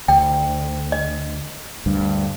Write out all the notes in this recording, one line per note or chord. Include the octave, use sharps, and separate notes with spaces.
D2 G5
D#5
D2 G2